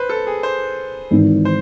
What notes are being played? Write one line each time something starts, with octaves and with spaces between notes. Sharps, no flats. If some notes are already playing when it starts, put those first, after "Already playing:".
Already playing: B4 C5
A4
G#4
C5
G#1 G#2 E3
C5